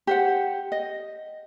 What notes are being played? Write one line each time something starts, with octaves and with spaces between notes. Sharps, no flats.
G4 C5 F#5
D#5